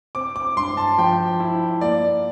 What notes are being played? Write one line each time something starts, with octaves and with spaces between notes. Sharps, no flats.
C4 D6
D6
G2 C6
A5
F3 G5
E4
A#3 D5